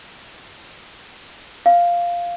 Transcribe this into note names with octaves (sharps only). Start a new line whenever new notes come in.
F5